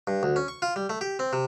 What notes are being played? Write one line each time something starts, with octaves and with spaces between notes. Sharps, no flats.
G2
D2
C#4
C#6
F4
G3
A3
G4
C4
C3